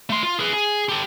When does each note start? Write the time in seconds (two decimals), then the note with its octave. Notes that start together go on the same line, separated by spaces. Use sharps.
0.10 A3 C6
0.23 F4
0.40 G#4 B4
0.53 G#4
0.89 G4 A4